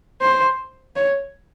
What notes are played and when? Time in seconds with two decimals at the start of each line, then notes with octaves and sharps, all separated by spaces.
0.21 C5
0.96 C#5